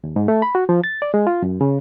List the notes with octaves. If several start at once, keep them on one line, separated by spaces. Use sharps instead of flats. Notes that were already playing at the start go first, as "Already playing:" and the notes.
D#2
G#2
A3
B5
F#4
F3
A6
D5
G#3
F4
F#2
C#3